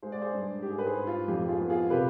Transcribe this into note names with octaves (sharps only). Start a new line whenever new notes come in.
G#3 C5
D5
G#4 C5
G2
G#2 G4
G#4
B4
G#4 C5
G#2
F4
F2 G4
F4 G#4
B3
F4 G#4
C3 G4 B4